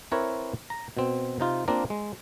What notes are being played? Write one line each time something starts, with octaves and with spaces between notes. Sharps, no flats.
C4 E4 A#4 B4 C#5
A#5
B2 C4
C3 D#4 F4
A#3 C4 D4 F4 A#4
G#3